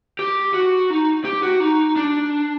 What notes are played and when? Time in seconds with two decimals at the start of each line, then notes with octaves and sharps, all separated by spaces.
0.19 G4
0.54 F#4
0.90 D#4
1.25 G4
1.43 F#4
1.60 D#4
1.96 D4